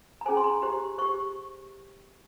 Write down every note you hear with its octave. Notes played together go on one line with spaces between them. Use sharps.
A#5
C#4 G#4 C5 G#5
C6
A#5
G4 C5 A#5
G4 C5 C#6